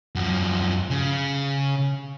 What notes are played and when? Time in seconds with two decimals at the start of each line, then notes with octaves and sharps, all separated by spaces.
0.15 F#2 F3
0.90 C#3